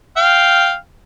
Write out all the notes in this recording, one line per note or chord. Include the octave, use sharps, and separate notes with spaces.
F5 G5